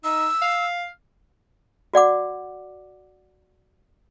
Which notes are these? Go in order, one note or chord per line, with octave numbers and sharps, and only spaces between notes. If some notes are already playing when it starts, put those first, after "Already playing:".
D#4 E6
F5
F#4 D5 F#5 D6